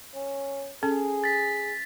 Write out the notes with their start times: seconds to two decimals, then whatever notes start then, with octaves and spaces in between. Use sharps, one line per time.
0.14 C#4
0.83 C#4 G#4 A4 G#5
1.24 A6 B6